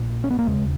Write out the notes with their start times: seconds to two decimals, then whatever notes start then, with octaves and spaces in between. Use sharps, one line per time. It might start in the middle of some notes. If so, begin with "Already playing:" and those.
Already playing: A#1 A#2
0.24 C#4
0.31 B3
0.39 A#3
0.46 E1 D#2 C#3 G#3